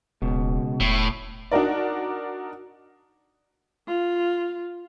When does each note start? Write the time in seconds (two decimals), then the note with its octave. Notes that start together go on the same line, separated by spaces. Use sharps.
0.22 D#1 C#2 B2
0.80 E1 A2
1.52 D4 D#4 F#4 A#4 D5
3.87 F4